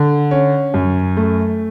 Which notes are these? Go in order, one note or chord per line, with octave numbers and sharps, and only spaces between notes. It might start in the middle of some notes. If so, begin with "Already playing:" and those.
Already playing: D3
C#4
F#2
A3